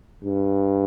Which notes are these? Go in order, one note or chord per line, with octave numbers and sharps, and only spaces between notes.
G2